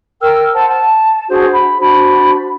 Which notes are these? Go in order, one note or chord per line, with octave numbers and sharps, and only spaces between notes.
A#4 G5 E6 F6
C5 F#5 A5
A5
D4 F#4 G#4 C5
B5
D4 F#4 C5 B5